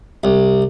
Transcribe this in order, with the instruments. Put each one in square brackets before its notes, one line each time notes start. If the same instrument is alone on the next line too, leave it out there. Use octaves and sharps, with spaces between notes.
[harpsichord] C2